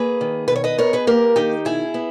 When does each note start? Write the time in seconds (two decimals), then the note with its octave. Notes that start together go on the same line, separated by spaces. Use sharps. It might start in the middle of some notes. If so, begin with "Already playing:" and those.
Already playing: A#3 G#4 B4
0.21 D#3
0.48 B2 B4
0.56 C#5
0.64 B4 D#5
0.78 B3 A#4 C#5
0.93 G#4 B4
1.07 A#3 G4 A#4
1.36 D#3 D#4 G4
1.65 B2 E4 G#4
1.94 B3